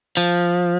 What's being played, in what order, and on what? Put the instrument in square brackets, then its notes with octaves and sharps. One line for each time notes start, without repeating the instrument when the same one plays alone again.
[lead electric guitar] F3